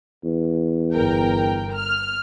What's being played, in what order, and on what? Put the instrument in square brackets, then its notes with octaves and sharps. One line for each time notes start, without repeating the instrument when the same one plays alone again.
[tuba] E2
[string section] G1 A#4 G5
F6